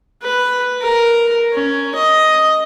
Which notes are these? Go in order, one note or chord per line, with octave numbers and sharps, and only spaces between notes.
B4
A#4
C#4
D#5